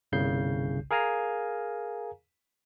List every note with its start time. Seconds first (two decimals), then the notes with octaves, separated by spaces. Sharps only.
0.12 G1 C2 C#3 G6 C7
0.91 G#4 A#4 F5 G#5 A#5